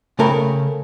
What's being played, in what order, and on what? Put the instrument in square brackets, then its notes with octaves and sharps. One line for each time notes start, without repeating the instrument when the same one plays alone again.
[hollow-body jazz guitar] C#3 A3 A#4 C#5 G5 B5